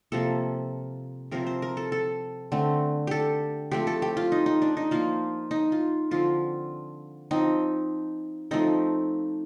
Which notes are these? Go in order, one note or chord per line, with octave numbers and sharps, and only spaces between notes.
C3 F3 A#3 A4
C3 F3 C4 A#4
C5
A#4
A4
A4
D3 A3 C4
G4 A4
F3 A3 C4 G4
A4
G4
F4
D#4
D#4
D4
D#4
F3 A#3 F4
D#4
F4
D3 F3 C4 F4
F3 C4 D#4
F3 A3 C4 D#4